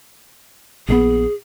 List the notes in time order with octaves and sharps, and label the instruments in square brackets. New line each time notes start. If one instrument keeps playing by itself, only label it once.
[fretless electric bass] A#1 D#3 B3 [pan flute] G#4